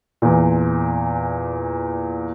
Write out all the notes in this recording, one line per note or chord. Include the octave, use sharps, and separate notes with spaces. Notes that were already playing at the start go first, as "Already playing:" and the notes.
E2 A#2